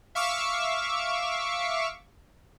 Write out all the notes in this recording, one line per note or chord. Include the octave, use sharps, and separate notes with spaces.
E5 F5 C#6 D6 E6